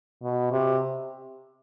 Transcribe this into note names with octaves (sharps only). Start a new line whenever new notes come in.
B2
C3